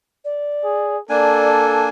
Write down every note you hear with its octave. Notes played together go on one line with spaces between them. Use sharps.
D5
G#4
A#3 D4 A4 D5 G#5